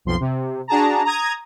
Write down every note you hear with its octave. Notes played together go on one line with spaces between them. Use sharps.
B1 F2 F3 C6
C3
D4 F#4 G#4 A5 A#5
A#5 D#6 G#6